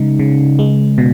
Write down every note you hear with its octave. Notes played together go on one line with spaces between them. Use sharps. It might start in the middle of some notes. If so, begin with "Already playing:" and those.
Already playing: C#3 G#3 D#4
C#3
G#3
B2